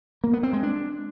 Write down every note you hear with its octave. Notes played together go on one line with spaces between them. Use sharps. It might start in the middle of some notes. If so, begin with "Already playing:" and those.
A#3
B3
C4
G#3
D4